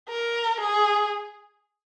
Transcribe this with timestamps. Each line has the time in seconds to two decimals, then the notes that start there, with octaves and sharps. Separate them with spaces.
0.09 A#4
0.61 G#4